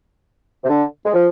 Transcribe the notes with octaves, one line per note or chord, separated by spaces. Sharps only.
C3
D3
G#3
F3